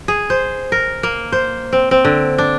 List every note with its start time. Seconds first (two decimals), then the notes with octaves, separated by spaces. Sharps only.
0.08 G#4
0.30 C5
0.72 A#4
1.03 A#3
1.32 C5
1.73 C4
1.91 C4
2.05 D3
2.38 D4